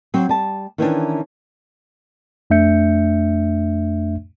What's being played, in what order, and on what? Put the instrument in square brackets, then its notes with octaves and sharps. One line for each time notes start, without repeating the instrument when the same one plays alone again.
[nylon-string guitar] F#3 C4
G3 A5
D#3 E3 C#4 D4
[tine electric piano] F2 A3 D4 E5 G6 C#7